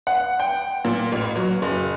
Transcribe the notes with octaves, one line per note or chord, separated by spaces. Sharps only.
F#5
G5
A#2
A1
F#3
F#1